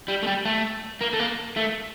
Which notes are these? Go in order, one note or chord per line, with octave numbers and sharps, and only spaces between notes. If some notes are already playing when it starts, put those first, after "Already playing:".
G3
A3
G3
A3
A#3
A3
A#3
A3